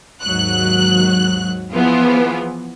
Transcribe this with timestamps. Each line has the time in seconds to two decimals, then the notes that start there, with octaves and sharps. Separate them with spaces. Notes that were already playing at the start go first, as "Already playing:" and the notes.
0.23 D#2 G#2 F#3 F#6
1.72 E3 F3 B3 E4 F4 G#4